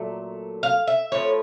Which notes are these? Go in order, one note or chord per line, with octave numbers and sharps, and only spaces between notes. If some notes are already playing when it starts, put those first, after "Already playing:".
Already playing: A#2 F#3 A3
F5
E5
A2 F3 C#5